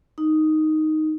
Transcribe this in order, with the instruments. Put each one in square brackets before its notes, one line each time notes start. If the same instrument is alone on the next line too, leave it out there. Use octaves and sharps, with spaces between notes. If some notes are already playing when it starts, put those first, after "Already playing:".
[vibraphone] D#4